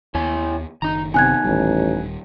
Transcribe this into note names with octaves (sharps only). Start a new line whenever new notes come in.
D#2 B3 E4 C#5 G#5
F#1 D#3 D#4 A#5
C3 B3 D#4 G#5 F#6 G#6
D#1 A1 D#3 G3